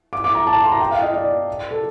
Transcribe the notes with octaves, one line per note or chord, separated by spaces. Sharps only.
D6
D6
A#5
A5
D6
C6
A#5
G5
F5
D#5
D5
A4